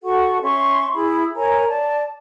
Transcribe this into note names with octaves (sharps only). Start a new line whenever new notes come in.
F#4 A4 F#5 C#6
C#4 E5 C6 C#6
E4 G#4 B5
A#4 C#5 G#5 A#5
D5 A5